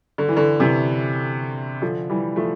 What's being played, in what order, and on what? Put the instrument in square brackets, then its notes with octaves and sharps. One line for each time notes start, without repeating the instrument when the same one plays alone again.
[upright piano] D3
E3
D3
C3 E3
D3 F3
E3 G3
F3 A3